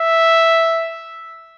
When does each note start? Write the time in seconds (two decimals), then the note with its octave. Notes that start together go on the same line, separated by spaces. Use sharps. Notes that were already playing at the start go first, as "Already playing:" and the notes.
Already playing: E5